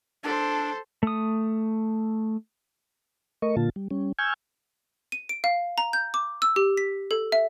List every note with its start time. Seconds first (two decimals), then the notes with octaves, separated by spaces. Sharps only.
0.23 D4 A4 C5
1.03 A3 D#6
3.42 A3 A#4 D#5 C#6
3.57 A#2 D3 A#3 F4 A5
3.76 G3
3.91 G3 C#4
4.19 G#5 C#6 E6 F6 G6 G#6
5.12 D#7
5.29 D7
5.44 F5
5.78 A#5
5.93 G6
6.14 D6
6.42 E6
6.56 G4
6.77 B6
7.11 A4
7.32 E5